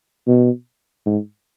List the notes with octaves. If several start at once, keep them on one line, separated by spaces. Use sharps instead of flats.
B2
G#2